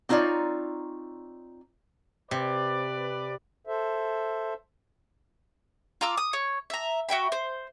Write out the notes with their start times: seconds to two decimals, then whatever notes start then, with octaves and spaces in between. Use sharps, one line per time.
0.09 C4 D#4 F4 C#5 D5
2.31 C3 B4 D5
3.67 A4 C5 E5
6.01 F4 A#5 D6 E6
6.18 D#6
6.33 C#5
6.70 E5 A#5
7.09 F#4 E5 G5 B5
7.32 C5